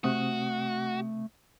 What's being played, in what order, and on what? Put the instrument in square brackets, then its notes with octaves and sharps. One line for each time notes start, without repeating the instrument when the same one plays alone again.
[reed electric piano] C3 C4 D#6 [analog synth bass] A3 [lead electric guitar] F#4